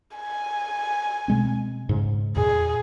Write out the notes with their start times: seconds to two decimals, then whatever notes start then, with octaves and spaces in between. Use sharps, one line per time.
0.17 G#5
1.28 B2 G#3 C4
1.89 G#2 C#3
2.36 E2 A#2 G#4